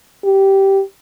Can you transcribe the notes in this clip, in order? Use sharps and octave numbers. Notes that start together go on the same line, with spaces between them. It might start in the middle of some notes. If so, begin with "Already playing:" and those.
G4